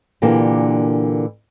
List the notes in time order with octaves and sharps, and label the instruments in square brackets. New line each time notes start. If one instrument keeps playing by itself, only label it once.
[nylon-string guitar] A#2 D3 E3 A#3 D4 G4